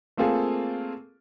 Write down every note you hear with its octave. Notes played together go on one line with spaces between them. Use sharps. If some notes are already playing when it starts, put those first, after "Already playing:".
A3 A#3 C4 F4 G#4 A4